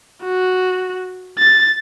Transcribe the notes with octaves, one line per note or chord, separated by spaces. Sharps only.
F#4
A6